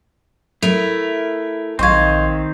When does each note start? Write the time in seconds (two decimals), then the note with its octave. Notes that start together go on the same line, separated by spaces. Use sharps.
0.62 A3 E4 A#4 F7
1.79 A#1 D#3 C4 D#5 F5 C6 C#6 G#6